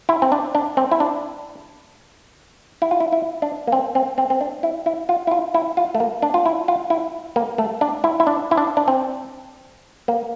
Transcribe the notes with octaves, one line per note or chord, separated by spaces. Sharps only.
E4
C4
D4
D4
C4
E4
D4
E4
F4
E4
E4
D4
A#3
C4
C4
C4
C4
D4
E4
E4
F4
E4
F4
E4
F4
A3
A#3
D4
F4
E4
F4
E4
A#3
A3
D4
E4
E4
D4
E4
D4
D4
C4
A#3